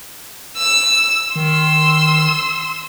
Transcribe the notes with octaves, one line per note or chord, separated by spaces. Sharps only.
E6
D#3 C6 E6